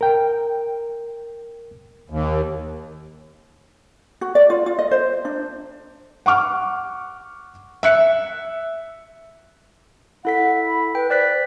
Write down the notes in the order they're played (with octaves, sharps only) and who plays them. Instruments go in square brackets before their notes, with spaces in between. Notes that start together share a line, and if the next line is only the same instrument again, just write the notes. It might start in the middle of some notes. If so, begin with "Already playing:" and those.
[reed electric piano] A#4 G5
[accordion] D#2
[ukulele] F#4
D5
F4
F4
D#5
C5
D4
[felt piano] F#5 C#6 D6 F6
E5 F#6 C#7
[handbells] E4 A4 B6 [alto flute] F#5
[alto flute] B5
[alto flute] B4 [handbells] G5
[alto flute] C5 [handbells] D5 F#6 B6